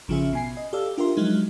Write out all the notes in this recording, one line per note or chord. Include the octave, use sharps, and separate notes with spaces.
A1 C#3 F3 C#4 G#4 E5
B2 G#5 C7
D#5
G4 A4 D5 F5 E6
D4 F4 G4 A#4 E5 C6
F3 F#3 G#3 D#4